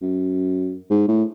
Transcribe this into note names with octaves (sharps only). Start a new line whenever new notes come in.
F#2
G#2
A2